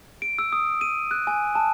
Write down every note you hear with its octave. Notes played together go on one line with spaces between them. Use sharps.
D7
E6
D#6
D#7
F#6
G#5
A5